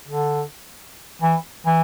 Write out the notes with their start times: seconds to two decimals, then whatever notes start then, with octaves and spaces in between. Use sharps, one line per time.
0.08 D3
1.22 E3
1.66 E3